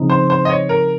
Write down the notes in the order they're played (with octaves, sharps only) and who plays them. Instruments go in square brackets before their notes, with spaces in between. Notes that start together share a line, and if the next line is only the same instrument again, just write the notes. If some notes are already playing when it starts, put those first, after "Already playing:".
Already playing: [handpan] C#3 F3 C4 D#4
[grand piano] C5
C5
D#5
C#5
A#4